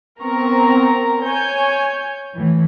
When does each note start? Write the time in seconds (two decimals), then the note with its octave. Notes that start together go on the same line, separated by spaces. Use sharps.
0.21 B3 C4 A#4 A#5 C#6
1.21 C#5 G#5 G6
2.35 A2 E3